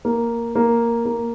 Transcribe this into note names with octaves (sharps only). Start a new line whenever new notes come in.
A#3
A#3
A#3